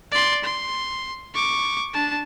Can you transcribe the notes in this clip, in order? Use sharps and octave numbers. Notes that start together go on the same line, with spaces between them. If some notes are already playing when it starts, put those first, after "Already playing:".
D5 C6
C6
C#6 D6
D4 A5